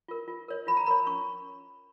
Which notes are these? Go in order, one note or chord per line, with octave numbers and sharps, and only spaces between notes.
F4 A#4
F4
A#4 C#5
F4 B5
A#5
A#4 C#5 B5
C#4 C#6